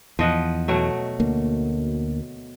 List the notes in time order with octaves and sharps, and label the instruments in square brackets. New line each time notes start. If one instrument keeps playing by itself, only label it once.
[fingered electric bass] E2 [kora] F3 D#5 F#5
[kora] B2 F#3 A3
[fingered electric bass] D2 A#3